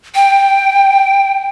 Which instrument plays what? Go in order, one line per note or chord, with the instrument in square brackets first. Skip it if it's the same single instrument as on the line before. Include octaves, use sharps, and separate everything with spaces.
[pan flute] G5